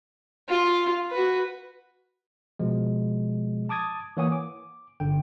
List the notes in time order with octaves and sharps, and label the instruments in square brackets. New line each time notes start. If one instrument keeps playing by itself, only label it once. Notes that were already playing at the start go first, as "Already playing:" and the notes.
[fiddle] F4
F#4 B4
[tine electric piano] B2 F3 G#3
A5 D6 D#6 G#6 A6
E3 A#3 C#5 F#5 G#5 D#6
D6
G1 D3 G5